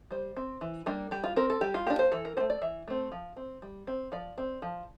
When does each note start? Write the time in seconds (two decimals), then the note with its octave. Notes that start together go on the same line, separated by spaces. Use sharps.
0.11 G3 C5
0.37 C4
0.61 E3
0.86 G3 A#3 D4
1.11 G3 G4
1.24 F4
1.36 C4 A#4
1.50 A4
1.61 G3 G4
1.74 F4
1.87 A#3 D4 G4
1.99 C5
2.12 E3 A4
2.25 A#4
2.37 C4 C5
2.40 A3
2.50 D5
2.62 E3 E5
2.88 A3 C4
3.12 F3
3.37 C4
3.62 G3
3.87 C4
4.12 F3 D5
4.38 C4
4.62 F3